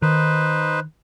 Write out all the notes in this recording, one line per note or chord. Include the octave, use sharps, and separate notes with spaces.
D#3 D#4 B4 C5